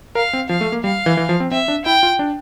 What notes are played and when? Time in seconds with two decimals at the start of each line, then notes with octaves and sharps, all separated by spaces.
0.15 A#4 F5
0.33 C4
0.49 F3 F5
0.61 A3
0.72 A#3
0.84 G3 F5
1.06 E3
1.17 E3
1.29 F3
1.40 C4
1.51 C4 E5
1.68 D4
1.85 E4 G5
2.03 F4
2.19 D4